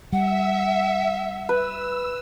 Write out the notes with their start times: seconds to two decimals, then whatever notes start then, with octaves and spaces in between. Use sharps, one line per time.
0.13 G3 E5 F#5
1.49 B4 E6